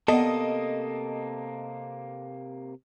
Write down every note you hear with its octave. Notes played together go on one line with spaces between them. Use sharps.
C3 A#3 B3 A4 D5 D#5 F#5